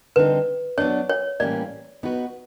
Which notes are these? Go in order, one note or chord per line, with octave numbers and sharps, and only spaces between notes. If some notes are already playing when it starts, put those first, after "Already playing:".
D3 G3 C4 D#4 B4
F#3 B3 D4 C#5
C#5
A2 E3 G3 A#3 C#4 D5
B3 D#4 F#4 B4